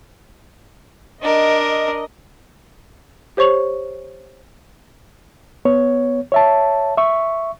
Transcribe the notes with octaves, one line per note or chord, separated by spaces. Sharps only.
D4 A#4 D#5
G4 C5 C#5 C#6 F7 F#7
B3 C#5
C#5 E5 A5
E5 C#6